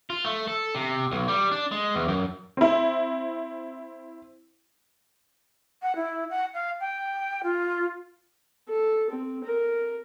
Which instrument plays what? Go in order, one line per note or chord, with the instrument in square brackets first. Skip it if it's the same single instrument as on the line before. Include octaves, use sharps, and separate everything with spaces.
[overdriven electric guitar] F4
A3
A4
C3
B1
G3
D4
G#3
E2
F#2
[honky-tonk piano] C4 E4
[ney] F#5
E4
F#5
F5
G5
F4
[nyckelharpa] A4
C4
A#4